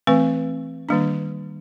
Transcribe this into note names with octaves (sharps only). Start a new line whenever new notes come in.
E3 A3 C4 B4
D#3 G3 A#3 D4